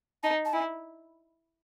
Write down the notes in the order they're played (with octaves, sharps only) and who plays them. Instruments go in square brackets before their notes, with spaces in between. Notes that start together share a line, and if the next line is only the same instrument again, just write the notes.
[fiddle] D#4 [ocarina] A5
[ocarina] A5
[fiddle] E4 [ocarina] G#5